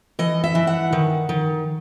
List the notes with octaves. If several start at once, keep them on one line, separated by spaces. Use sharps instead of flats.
E3 D#5
E5
E3
F#5
D#3
D#3